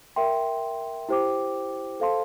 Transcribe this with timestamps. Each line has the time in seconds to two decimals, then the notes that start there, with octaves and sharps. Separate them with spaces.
0.16 A#4 E5 G5 C6
1.09 E4 G4 C5 G5 D6
2.00 A4 C5 F5 A5 C6